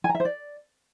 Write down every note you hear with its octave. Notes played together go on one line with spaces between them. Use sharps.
G#5
A#5
E5
C5
D5